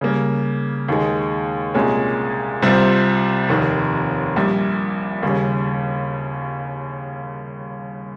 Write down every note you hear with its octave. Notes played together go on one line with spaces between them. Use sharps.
C#3 G3 A#3
D#2 D#3 G#3
C2 A#2 G#3 C#4
C2 C3 G3 C4 F4
F1 D#2 D#3
A#1 A#2 G3
D#2 C#3 G3